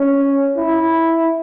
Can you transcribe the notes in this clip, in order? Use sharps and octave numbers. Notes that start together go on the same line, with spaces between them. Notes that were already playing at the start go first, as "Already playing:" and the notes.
Already playing: C#4
E4